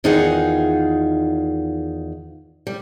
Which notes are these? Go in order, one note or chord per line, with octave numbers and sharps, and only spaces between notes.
E2 D#3 D#4 F4 G#4 F#5
G3